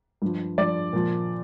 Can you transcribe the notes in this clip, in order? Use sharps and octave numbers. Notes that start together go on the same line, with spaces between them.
G2 F3
G2 F3 D5
A#2 F3